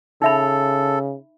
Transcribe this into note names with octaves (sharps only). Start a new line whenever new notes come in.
C#3 D#4 A4 E5 B5